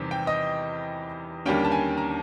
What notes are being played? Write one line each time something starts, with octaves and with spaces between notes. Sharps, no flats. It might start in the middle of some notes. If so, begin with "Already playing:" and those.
Already playing: E2 C3 D#3 G3 C4
G5
D#5
D#2 D3 G3 A#3 C#4 G5
A5
G#5
A#5